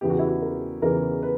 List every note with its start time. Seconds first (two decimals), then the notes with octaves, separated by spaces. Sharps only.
0.01 E2 C#3 E3 B3 G4
0.10 F#4
0.19 E4
0.28 F#4
0.42 A#4
0.82 E2 C#3 E3 B3 A#4
1.23 B4